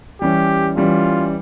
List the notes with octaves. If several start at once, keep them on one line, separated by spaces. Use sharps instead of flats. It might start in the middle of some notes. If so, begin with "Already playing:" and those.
E3 G3 C#4 G4
E3 G3 C#4 F4